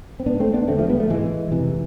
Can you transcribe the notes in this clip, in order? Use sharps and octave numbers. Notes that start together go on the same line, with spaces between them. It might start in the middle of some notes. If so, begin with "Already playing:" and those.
C4
G#2 B3 D4
A3 C4
B3 D4
E2 D3 A3 C4
F3 A3
G#3 B3
F3 A3
G#2 E3 G#3
F2 C3 E3